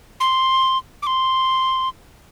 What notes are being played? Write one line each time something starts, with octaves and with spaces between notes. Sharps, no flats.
C6
D6
C6